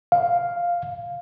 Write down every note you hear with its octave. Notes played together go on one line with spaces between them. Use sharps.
F5